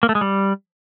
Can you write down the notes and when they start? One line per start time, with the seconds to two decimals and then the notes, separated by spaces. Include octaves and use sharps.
0.03 A#3
0.09 A3
0.15 G#3
0.21 G3